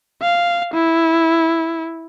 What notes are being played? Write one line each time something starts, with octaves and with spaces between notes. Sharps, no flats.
F5
E4